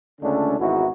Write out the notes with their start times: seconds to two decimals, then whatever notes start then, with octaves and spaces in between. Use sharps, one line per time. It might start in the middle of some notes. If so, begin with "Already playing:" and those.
0.21 C#2 D3 A3 C#4 D4
0.59 G#1 E2 D#4 E4 F#4